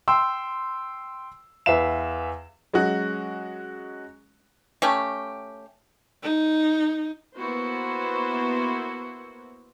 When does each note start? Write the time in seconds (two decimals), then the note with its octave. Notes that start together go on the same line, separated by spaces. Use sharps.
0.08 G5 C6 E6
1.66 E2 B4 E5 F5 E7
2.73 F#3 G#3 C#4 F#4
4.82 A3 C#4 G4
6.23 D#4
7.37 A#3 B3 E4 F#4 C5